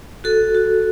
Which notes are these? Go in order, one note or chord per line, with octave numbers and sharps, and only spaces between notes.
F#4 A4
F#4